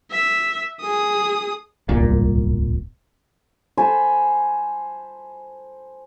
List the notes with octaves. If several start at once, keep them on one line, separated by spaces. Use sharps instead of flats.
E5
G#4 D#6
D1 G1 C2 A#2
C5 G#5 A5 B5